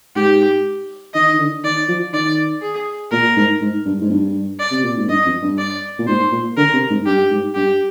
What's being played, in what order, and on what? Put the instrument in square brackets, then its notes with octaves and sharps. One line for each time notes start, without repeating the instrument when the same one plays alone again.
[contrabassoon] G#2 [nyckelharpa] G4
[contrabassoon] D#3 [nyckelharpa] D#5
[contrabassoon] D#3
D3
[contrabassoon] D#3 [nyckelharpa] D5
[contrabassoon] F3
[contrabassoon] D#3 [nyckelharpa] D5
[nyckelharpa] G#4
[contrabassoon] A#2 [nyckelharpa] A#4
[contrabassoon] G#2
G#2
G2
G#2
G2
[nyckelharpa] D5
[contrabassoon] C3
A#2
G#2
[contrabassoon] G2 [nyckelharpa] D#5
[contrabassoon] F2
G2
[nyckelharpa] D5
[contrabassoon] A#2
[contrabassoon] G#2 [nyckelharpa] C5
[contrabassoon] A#2
[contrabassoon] D3 [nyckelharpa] A#4
[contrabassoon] C3
G#2
[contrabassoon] G2 [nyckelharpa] G4
[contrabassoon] G#2
[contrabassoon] G2 [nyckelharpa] G4